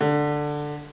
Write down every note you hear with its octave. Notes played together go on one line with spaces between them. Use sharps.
D3